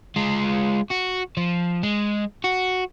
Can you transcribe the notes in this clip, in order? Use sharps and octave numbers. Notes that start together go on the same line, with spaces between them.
G#3 F4
F#4
F3
G#3
F#4